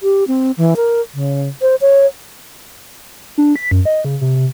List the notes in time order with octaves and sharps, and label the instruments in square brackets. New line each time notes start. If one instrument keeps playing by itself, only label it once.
[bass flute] G4
C4
E3
A#4
C#3
C5
C#5
[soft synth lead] D4
B6
F#2
D#5
C#3
C3
C3